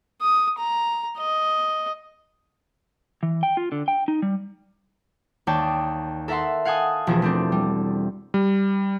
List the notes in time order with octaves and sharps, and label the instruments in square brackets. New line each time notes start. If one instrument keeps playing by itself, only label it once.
[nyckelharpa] D#6
A#5
D#5
[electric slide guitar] E3
G5
F4
D3
G5
D#4
G3
[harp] D#2 A#3 C#5 D5 G5 A5
A4 A#4 E5 F#5 A5 C6
F5 F#5 G#5 A5 D#6
E1 F3 A#3 G#4 A4
A3 C4 D4
G3
[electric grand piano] G3